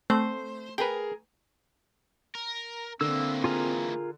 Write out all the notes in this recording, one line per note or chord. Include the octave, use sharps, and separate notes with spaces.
A3 C4 C5
G#4 A#4 B4 G5
A#4
D3 E3 A#3 C4 E6
F4 G#4 A#4